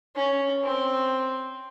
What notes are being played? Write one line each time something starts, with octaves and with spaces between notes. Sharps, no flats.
C#4
C4